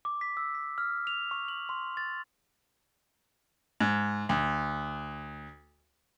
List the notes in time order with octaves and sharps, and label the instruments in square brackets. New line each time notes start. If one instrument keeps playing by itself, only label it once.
[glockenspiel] D6
B6
E6
B6
F6
F7
C#6
F#7
C6
A6
[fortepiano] G#2
D2